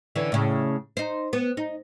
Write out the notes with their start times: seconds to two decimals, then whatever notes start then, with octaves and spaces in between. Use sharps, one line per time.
0.16 D3 E3 C#4
0.32 A2 C#3
0.97 D#4 C5
1.33 B3
1.57 D#4